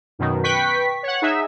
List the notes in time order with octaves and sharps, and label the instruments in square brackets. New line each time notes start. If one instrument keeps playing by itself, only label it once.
[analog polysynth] F#2 B2 D#3
B4 G5 C#6 B6
C#5 F#5
D#4 G#4 E5